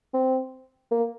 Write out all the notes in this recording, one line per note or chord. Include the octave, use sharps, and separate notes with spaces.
C4
A#3